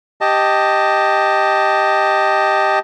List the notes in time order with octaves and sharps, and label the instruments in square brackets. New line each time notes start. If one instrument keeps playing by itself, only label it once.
[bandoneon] G4 D#5 A5